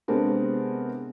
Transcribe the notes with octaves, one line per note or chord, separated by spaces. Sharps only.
C3 G#3 B3 C4 D4 A#4